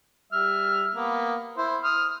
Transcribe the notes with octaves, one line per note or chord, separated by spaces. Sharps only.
G3 E5 F6
A#3 B3
E4 C5
D#6 F6